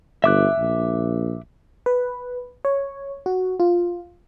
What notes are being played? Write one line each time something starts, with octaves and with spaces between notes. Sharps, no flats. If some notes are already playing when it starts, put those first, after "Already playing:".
G1 E5 D6 F#6
A#1
B4
C#5
F#4
F4